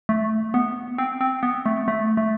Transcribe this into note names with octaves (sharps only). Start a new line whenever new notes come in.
A3
B3
C4
C4
B3
A3
A3
A3